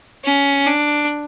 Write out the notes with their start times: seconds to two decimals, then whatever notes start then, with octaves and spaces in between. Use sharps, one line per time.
0.25 C#4
0.66 D4